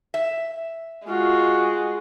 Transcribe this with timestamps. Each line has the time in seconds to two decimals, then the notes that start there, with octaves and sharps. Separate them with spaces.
0.14 E5
1.07 G#3 F4 F#4